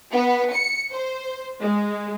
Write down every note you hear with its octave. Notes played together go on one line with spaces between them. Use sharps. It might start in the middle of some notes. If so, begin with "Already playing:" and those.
B3
C#7
C5
G#3